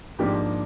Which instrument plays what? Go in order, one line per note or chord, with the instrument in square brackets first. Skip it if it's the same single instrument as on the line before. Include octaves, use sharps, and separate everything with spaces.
[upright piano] G#2 F3 A#3 D4 G4